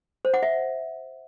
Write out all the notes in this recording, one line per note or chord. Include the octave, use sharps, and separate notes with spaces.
C5
F#5
E5